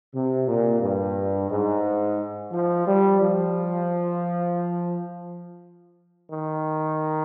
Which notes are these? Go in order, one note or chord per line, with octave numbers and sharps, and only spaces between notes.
C3
A#2
G2
G#2
F3
G3
F3
D#3